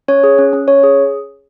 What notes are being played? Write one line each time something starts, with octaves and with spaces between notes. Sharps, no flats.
C#4 C#5
G#4
C#4
C#4
C#4 C#5
G#4